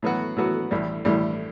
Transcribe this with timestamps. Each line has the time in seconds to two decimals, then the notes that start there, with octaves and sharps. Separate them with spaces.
0.03 A2 F#3 B3 F#4
0.36 A2 F#3 B3 F#4
0.71 A1 A2 G3
1.05 A1 A2 G3